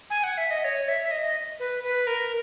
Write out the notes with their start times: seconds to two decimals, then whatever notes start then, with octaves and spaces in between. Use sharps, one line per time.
0.10 G#5
0.24 F#5
0.38 E5
0.51 D#5
0.64 C#5
0.88 E5
1.03 E5
1.11 D#5
1.60 B4
1.84 B4
2.07 A#4